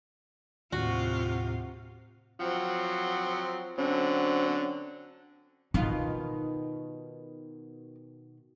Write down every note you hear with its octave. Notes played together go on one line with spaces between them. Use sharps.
D#2 A2 C3 F4 F#4
F3 F#3 C4 F#5
D3 F#3 C4 C#4
B2 D#3 D#4 F4